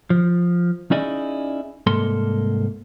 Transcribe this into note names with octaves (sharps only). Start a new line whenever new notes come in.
F3
C#4 D#4 E4 G#4 D5 D#5
C2 G#2 A#3 A4 C6